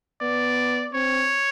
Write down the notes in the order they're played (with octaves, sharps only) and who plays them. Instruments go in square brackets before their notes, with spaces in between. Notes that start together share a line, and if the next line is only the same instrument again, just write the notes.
[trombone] B3 [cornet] D5
[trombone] C4 [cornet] C#5